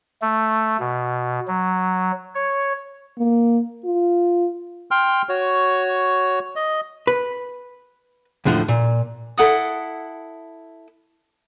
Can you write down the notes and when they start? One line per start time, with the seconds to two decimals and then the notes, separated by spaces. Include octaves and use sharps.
0.22 A3
0.80 B2
1.48 F#3
2.35 C#5
3.18 A#3
3.85 F4
4.91 G5 C6 F6
5.29 F#4 C#5
6.56 D#5
7.07 B4
8.45 D#2 A2 D3 F3
8.68 A#2
9.37 E4 A4 F#5 D#6